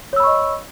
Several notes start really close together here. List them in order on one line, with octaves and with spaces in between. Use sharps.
C#5 E6 B5 C#6 D#5